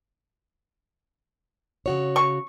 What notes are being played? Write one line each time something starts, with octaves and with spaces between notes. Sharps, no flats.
C#3 F#4 C#5
C#6